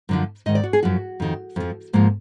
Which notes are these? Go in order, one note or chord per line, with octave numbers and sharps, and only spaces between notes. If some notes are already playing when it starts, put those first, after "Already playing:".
F#2 D3 F3
G#2 D#3 D#5
D5
F#4
G#4
F#2 F3 F#4
F2 D#3
F2 F3
G#2 F3 A#3